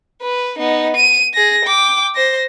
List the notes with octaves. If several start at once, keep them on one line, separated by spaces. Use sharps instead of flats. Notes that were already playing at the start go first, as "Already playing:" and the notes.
B4
B3 D#4
D#7
G#4 A#6
G5 D6
C5 A#6